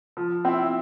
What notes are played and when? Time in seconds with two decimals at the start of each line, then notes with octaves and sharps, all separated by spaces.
0.17 F3
0.45 C4 E4